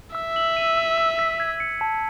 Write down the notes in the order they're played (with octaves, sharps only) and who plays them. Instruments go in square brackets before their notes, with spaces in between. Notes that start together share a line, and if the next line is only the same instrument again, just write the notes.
[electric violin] E5 [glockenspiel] E6
[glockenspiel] F#7
D#7
E6
E6
B6
G#6
C#7
A5